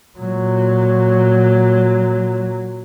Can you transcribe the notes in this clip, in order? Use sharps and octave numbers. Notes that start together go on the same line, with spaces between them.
A#2 F#3